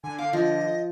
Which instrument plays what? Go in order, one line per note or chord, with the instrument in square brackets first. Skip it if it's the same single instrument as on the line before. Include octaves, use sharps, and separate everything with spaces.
[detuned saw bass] D3 [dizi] G#5
[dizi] F5 [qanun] D6
[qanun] F3 [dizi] D#5